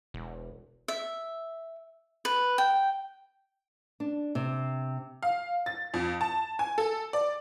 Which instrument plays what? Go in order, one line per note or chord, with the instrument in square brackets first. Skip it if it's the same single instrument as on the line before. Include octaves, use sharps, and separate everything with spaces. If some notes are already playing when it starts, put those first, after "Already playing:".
[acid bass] E1
[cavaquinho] E5
B4
G5
[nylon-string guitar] D4
C3
[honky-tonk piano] F5
A6
F2
A5
G#5
A4
D5